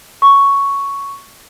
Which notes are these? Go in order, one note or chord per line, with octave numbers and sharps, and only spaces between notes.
C#6